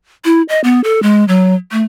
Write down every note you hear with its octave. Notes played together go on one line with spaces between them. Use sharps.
E4
D#5
B3
A4
G#3
F#3
A3